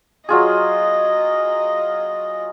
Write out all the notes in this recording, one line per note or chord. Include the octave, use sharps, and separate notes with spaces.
F#3 F4 G#4 D#5